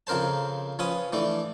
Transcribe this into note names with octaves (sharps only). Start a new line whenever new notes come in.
F2 C#3 A#4 C5 A5
F3 C#4 B4 D#6
E3 A3 D4